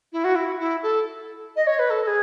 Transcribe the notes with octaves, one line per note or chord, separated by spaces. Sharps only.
E4
F#4
E4
E4
A4
D#5
C#5
B4
A4
A4
G#4